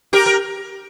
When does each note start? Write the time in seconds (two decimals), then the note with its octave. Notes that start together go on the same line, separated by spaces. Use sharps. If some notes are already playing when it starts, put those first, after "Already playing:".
0.13 G4 A#4
0.26 A#4